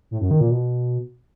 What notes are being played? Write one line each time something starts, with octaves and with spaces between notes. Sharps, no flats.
A2
F#2
D#3
A#2
B2